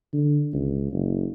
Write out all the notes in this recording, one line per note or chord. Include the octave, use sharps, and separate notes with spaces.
D3
C#2
F#1